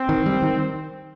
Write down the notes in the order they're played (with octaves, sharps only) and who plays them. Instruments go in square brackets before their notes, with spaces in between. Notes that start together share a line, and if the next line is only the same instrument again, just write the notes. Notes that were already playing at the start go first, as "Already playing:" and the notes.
Already playing: [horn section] C4
[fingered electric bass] D#3
G3
D#3